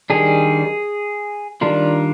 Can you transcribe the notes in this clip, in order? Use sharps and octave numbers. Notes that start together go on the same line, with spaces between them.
D#3 G3 D4 G#4
D#3 G3 D4 F4 A#4